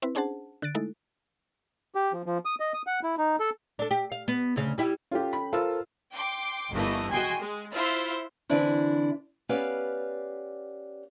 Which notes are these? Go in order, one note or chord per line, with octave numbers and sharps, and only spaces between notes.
C4 E4 B4
C#4 D4 G#4 C5 F#5 A5
D3 F#6 A6 D7
G#3 A3 D#4 E4 A4
G4
F3
F3
D#6
D#5
D#6
F#5
E4
D#4
A4
D4 A4
G4
F5
B3
D2 C#3
G3 E4 G4
C#4 F4 G4 A4 G5
B5
F4 A4 A#4 C5 E6
G5 C6 D6
G1 E3 A3 A#3 D#5
F#4 G#4 D#5 G5 G#5 C6
G#3
E4 F4 C5 E5 F5 C6
D3 E3 C4 D4 E4
B3 C#4 G4 B4 D5 F5